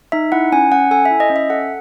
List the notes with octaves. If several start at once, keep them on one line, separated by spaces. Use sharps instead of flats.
D#4 E5
E4 F#5
C#4 G#5
C#4 F#5
A4 G#5
E5
E4
D#5
C#4
E5
A4 F#5